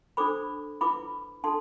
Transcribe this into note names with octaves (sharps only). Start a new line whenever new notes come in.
D4 A4 C5 B5 D6
E4 B4 B5 D6
D4 A4 A5 C6